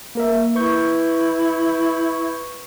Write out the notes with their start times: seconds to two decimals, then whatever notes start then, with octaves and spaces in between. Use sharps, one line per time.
0.15 A#3 A#4 E5
0.55 E4 B4 C#6 G6